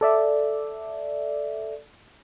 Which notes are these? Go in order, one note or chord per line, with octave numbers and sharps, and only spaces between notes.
A4 D5 E5